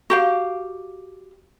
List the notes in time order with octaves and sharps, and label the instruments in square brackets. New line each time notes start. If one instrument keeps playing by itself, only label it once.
[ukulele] F#4 G4 F5